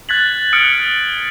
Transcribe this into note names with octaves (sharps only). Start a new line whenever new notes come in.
F#6 G#6 A6 B6 F#7
D#6 F6 F#6 C#7 D7